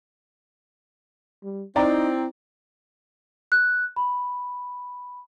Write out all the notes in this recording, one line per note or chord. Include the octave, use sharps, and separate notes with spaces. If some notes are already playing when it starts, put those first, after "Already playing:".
G3
C4 D#4 E4 C5 D5 G5 A#5
F#6
B5